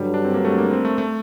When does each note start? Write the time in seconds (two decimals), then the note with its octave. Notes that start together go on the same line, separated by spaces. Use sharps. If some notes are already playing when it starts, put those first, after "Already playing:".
Already playing: G2 D3 F#3 G3
0.14 D4
0.25 C4
0.34 A#3
0.45 A3
0.58 A#3
0.71 C4
0.85 A3
0.98 A3